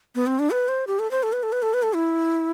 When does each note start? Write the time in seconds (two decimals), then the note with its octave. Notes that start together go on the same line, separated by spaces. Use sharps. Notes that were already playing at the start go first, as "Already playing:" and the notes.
0.15 B3
0.27 C4
0.39 D4
0.51 B4
0.68 C5
0.87 G4
0.99 A4
1.11 C5
1.23 A4
1.33 B4
1.43 A4
1.52 B4
1.62 A4
1.74 B4
1.83 A4
1.95 E4